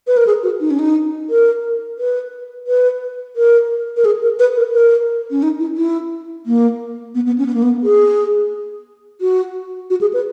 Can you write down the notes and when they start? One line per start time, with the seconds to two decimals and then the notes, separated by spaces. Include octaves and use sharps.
0.07 B4
0.17 A#4
0.27 G#4
0.43 F#4
0.60 D#4
0.70 C#4
0.79 D#4
1.29 A#4
1.98 B4
2.67 B4
3.36 A#4
3.97 A#4
4.05 G#4
4.22 A#4
4.39 B4
4.56 A#4
4.74 A#4
5.31 C#4
5.43 D#4
5.60 E4
5.77 E4
6.46 A#3
7.15 B3
7.26 B3
7.38 C#4
7.46 B3
7.54 A#3
7.62 B3
7.83 G#4
9.21 F#4
9.90 F#4
10.01 G#4
10.13 B4